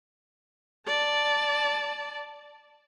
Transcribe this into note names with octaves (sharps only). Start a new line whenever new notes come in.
D5 A5